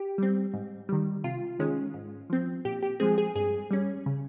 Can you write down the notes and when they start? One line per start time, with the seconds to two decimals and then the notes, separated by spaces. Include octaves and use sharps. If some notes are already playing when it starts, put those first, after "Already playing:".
Already playing: G4
0.18 G3 C4
0.54 G#2
0.89 D#3 G3
1.24 C3 F4
1.59 D#3 G#3 C#4
1.94 G#2
2.30 F3 C4
2.65 A#2 G4
2.83 G4
3.00 F3 G#3 C4 G#4
3.18 G#4
3.35 G2 G#4
3.71 G3 C#4
4.06 C#3